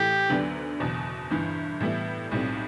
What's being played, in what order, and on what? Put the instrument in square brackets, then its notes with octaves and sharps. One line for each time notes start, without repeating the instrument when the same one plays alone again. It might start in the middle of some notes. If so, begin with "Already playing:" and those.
Already playing: [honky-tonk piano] A2 E3 A3 [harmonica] G4
[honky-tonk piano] D2 D3 F#3 B3 D4
F#1 E2 B2
G1 G2 E3
A2 E3 G3 B3 E4
B1 A2 G3 C4